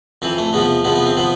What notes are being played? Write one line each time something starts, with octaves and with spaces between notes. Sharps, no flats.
F2 E3 C4
A3
E2 C3 F3 B3
E2 C3 F3 B3
B3
C4
C3 F3 B3